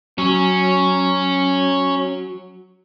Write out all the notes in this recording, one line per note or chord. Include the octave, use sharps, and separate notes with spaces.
F#3 C#4